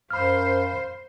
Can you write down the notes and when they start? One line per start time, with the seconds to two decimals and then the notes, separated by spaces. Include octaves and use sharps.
0.11 F#2 C5 F5 B5 F6